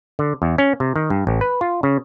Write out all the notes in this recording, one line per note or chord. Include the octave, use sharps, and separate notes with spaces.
D3
E2
C#4
C3
D#3
G2
A1
B4
F4
C#3